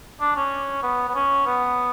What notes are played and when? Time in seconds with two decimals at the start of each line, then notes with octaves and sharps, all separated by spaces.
0.20 D4
0.36 C#4
0.83 B3
1.08 B3
1.15 C#4
1.46 B3